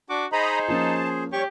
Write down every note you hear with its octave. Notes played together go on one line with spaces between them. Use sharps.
D4 F#4 D6
D#4 G#4 C5 D#5 A#5 B5
F3 A#3 C#4 A5
G3 G4 C#5 C#6